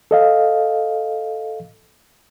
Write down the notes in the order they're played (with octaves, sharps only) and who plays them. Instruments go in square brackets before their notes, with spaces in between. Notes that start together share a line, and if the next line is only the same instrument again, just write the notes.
[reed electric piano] A4 D#5 F5